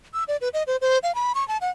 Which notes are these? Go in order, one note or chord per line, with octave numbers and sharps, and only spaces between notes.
E6
D5
B4
D#5
C5
C5
F5
B5
C#6
A5
F#5